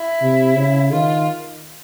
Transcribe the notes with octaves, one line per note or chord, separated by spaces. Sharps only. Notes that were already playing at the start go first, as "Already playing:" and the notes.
Already playing: E4
C3
C#3
D#3 F4